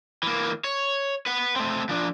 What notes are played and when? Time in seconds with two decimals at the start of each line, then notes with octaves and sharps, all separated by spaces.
0.23 E3 A#3
0.64 C#5
1.26 B4 F#5
1.56 A3 C4
1.89 F3 D4